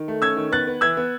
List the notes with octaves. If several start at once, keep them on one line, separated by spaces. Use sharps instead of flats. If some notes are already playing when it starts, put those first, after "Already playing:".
Already playing: D#3
A3
C#4 E6 G#6
D#3
B3 F#6 A6
B3
E3 E6 G#6
B3